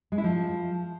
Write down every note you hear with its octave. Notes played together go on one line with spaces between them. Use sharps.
G#3
E4
F3